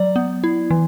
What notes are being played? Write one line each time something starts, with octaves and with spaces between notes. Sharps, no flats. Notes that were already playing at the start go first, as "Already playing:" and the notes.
Already playing: F#3 D5
B3
E4
E3